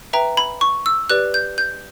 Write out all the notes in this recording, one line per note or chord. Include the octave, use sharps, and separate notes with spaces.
B4 E5 G5 A#5
B5
C#6
E6
G4 B4 D5 F#6
G6
G6